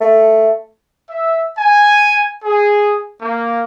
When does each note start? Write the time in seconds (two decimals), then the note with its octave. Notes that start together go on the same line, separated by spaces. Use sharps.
0.01 A3
1.08 E5
1.57 G#5
2.43 G#4
3.21 A#3